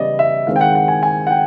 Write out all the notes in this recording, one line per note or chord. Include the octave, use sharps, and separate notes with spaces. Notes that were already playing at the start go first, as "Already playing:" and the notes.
Already playing: C#3 E3 G3 B3 D5 D#5
E5
D#3 G#3 C4 F5
G5
F#5
F#5
G#5
G#5
F#5
G5